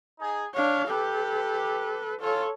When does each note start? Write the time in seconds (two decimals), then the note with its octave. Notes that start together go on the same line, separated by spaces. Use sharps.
0.19 D#4 G#4
0.54 D4 C#5 F5
0.88 G4 A4 B4
2.20 C#4 F4 A4 C#5